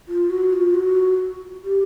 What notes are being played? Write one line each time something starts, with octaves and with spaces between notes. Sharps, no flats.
F4
F#4
F4
F#4
G4